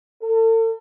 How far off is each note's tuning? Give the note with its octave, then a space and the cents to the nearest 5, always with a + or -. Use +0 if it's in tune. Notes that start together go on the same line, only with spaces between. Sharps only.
A4 +40